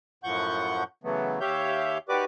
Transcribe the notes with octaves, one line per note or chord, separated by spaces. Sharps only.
F#2 A2 F3 F#5 C#6 G6
C#3 E3 F#3 A3 B3
D#2 G4 C#5 E5 F5 G6
D#3 F#4 G4 B4 D5 D6